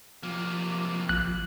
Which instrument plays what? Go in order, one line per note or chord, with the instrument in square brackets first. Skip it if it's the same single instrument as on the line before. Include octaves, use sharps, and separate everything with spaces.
[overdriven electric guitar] C3 A#3 [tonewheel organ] F3
[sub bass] G#1 [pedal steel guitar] F#6